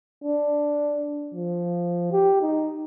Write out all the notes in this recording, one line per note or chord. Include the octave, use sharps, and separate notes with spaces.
D4
F3
G4
D#4